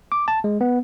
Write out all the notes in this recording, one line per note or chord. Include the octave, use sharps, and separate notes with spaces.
D6
A5
G#3
B3